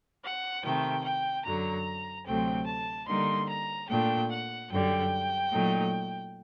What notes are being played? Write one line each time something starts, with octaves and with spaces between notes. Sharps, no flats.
F#5
C3 D#3 A3 G5
G5
F#2 D3 F#3 A#5
D2 C3 F#3 A3 C4 G5
A5
D3 G3 A#3 D#4 C6
A#5
A#2 A3 D4 G5
F#5
F#2 D3 G3 G5
A#2 F#3 A3 D#4